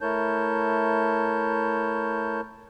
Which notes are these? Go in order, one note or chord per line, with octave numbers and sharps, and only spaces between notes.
A3 E4 A#4 C#5 A5 G6